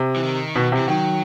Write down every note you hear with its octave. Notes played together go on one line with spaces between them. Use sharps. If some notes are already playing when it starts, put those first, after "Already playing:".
Already playing: C3
E3
D#3
B2
C3
E3
D#3 F#3